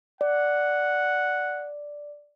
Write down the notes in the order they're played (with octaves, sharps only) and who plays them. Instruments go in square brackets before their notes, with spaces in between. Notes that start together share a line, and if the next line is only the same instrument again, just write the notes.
[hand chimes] D5 [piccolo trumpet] F#5